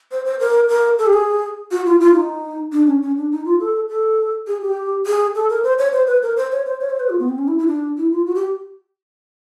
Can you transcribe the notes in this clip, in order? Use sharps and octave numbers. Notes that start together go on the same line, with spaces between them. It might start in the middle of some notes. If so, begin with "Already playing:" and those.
C5
C5
A#4
A#4
A4
G4
G#4
F#4
F4
F4
D#4
D4
C#4
C#4
D4
D#4
F4
A4
A4
G#4
G4
G#4
A4
A#4
C5
C#5
C5
B4
A#4
C5
C#5
C5
C#5
C5
B4
F4
B3
C4
C#4
E4
E4
D4
E4
F4
F#4
G4